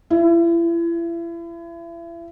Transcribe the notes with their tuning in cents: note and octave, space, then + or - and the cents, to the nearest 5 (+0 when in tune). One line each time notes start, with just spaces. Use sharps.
E4 +35